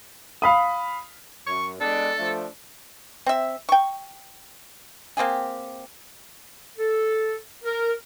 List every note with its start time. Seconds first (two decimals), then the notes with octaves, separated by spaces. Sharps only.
0.42 F5 B5 D#6
1.46 F#2 C#6
1.80 G#3 B3 D4 A4
2.17 F3 A3 D4
3.26 C4 E5
3.69 G5 C#6
5.17 A#3 C4 G4 G#4
6.78 A4
7.64 A#4